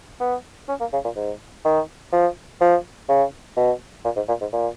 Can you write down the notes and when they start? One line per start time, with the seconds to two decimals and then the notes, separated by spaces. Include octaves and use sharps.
0.20 B3
0.69 C#4
0.80 A#3
0.93 C#3
1.04 A#2
1.16 G#2
1.65 D#3
2.12 F3
2.61 F3
3.09 C#3
3.57 B2
4.04 A#2
4.16 G#2
4.28 A#2
4.41 G#2
4.53 A#2